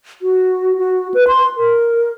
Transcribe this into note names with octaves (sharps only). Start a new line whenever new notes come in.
F#4
F#4
B4
C6
A#4